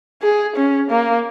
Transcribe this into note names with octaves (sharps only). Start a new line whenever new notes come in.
G#4
C#4
A#3